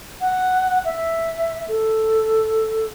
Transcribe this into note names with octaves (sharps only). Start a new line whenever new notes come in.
F#5
E5
A4